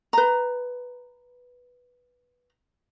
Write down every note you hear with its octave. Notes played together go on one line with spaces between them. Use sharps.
B4 A#5